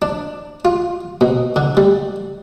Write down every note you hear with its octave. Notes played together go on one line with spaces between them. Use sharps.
D4
F4
B2
D3
G3